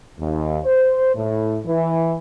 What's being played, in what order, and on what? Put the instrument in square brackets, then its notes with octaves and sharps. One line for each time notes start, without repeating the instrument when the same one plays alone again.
[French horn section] D#2
C5
A2
E3